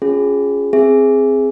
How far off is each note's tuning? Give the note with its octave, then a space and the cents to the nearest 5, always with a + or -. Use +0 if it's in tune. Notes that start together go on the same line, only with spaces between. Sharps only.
C#4 +0 F4 +35 G#4 +0
C4 +5 G#4 +0 E5 +0